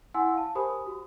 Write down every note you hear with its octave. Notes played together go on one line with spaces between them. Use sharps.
E4 F#5 G#5 C6 E6
F5 A5
G4 A#4 C5 G#5 B5 D#6
F#4